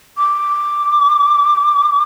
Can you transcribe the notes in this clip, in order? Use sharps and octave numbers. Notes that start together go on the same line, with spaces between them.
D6